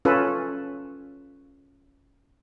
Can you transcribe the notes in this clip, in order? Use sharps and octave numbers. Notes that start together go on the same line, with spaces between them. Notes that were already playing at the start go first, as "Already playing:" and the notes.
C#4 F4 A4 B4